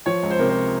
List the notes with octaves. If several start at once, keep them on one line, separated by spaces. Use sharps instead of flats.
F3 C#5
C#2
C5
C3 A#4
C5